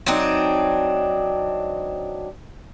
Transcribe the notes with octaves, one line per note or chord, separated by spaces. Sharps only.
F#3 C4 D4 D#4